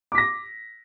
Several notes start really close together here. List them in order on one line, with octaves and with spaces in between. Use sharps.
D6 B6 A#6